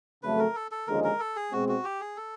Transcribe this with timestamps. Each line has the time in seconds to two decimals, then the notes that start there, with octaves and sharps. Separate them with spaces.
0.23 F2 C#3 F#3 A3 B4
0.39 A#4
0.55 A4
0.71 A4
0.87 D#2 D3 F3 G#3 C#4 A#4
1.04 A#4
1.20 A4
1.36 G#4
1.52 B2 G#3 C4 F#4
1.69 F#4
1.84 G4
2.00 G#4
2.17 A4